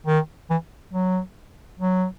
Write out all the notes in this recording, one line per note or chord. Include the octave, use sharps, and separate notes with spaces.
D#3
E3
F#3
F#3